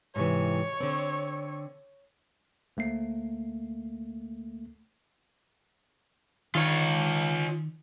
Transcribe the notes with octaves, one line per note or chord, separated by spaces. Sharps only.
G#2 C3 E3 C#5
D3 C4
D2 A3 A#3 C7
D#3 F4 C#5